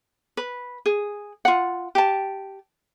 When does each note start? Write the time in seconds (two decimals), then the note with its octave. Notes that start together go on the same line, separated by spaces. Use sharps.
0.37 B4
0.86 G#4
1.45 F4 F#5
1.95 G4 A5